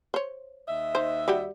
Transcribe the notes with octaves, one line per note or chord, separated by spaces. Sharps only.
C5 C#5
D#2 D#5 E5
D#4 C5
G3 F#4 G4